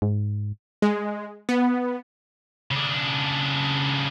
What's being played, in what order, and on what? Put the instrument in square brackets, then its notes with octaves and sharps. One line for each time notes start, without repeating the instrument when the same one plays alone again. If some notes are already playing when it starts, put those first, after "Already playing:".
[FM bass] G#2
[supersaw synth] G#3
B3
[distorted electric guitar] C#3 D4